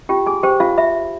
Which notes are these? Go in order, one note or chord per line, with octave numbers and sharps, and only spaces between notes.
F4 G4 G5
G#4 G#5
G4 C5 G5
F4 F5
F4 E5